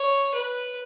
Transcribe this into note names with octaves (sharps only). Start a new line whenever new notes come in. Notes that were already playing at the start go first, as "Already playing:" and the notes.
Already playing: C#5
B4